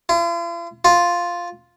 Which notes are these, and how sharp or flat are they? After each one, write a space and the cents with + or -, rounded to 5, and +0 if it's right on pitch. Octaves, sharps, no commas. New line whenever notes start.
F4 -45
F4 +0